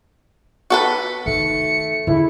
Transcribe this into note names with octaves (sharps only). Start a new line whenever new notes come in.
F#4 A4 B4
D#3 A3 C#7
C#2 D3 E4 F4